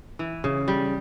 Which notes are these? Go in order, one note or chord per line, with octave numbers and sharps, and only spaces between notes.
E3
C#3
G3